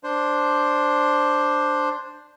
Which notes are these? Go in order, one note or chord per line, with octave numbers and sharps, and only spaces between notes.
D4 C5